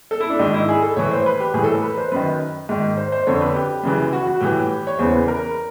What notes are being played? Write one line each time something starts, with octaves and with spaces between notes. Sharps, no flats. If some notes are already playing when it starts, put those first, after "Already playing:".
A4
E4
D4
G#2 D#3 D#4
E4
G#4
A4
A2 E3 C#5
C5
B4
G4
A2 E3 G#4
A4
A#4
B4
C5
F#2 D#3 B4
G#2 D#3
C5
C5
F2 D3 C#5
B4
G4
F#2 C#3 E3
F#4
F#4
A2 E3 G4
C#5
E2 C#3 E3 C5
B4
A#4